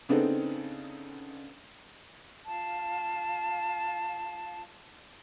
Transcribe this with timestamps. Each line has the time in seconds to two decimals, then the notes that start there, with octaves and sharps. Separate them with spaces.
0.09 C#3 B3 C4 D4 D#4 A4
2.46 F4 F5 A5